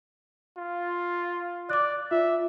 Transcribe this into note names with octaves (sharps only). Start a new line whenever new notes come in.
F4
D5 D6 F#6
F4 E5